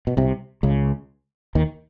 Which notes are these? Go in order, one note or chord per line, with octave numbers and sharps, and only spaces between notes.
B2
C2 C3
C#2 C#3
D#2 D#3